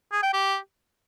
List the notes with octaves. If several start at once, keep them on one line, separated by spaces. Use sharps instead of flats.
G#4
G5
G4